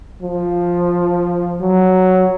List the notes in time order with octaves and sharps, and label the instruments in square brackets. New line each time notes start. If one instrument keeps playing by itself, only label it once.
[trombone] F3
F#3